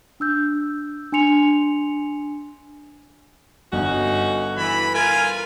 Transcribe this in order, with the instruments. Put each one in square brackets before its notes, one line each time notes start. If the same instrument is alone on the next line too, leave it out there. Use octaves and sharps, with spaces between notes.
[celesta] D4 E6 G6
D4 G#5 C6 C#7 F7
[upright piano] G1 [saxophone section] C#4 D#4 F#4
[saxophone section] E3 [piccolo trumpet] B5
[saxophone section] F4 A#4 [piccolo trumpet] G#5